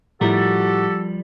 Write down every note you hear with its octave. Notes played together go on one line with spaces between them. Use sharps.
A2 F3 G3 E4 F#4 G4 A4 A#4